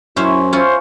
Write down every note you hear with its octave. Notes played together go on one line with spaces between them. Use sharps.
F#2 C#4 E4 C5 E5
C#4 E4 F4 C5